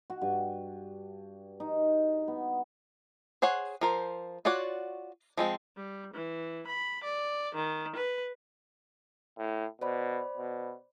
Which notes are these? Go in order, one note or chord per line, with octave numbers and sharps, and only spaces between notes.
F#4
G2
D#4
B3
G#4 C5 C#5 F#5
F3 A#4 C5
F4 F#4 C#5 D5 F#5
F3 G#3 C4
G3
E3
B5
D5
D#3
B4
A2
B2 C5 D5 B5
B2